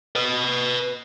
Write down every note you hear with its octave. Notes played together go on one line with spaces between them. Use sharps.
B4 D#5